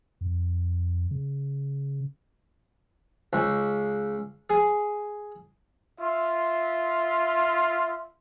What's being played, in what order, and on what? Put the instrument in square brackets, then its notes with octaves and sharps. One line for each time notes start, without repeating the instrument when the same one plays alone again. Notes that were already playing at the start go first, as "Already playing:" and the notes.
[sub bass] F2
C#3
[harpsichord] C#2
G#4
[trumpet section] F4 E5 C6